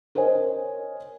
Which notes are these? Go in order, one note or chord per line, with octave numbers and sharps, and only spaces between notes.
A#4 C5 C#5 D#5 G#5